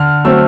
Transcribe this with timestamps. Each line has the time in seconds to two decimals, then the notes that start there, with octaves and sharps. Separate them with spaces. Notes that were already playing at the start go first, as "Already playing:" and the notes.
Already playing: D3 F6
0.25 F#3 A3 C4 E6